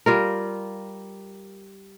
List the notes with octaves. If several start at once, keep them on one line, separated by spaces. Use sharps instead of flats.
G3 F4 A#4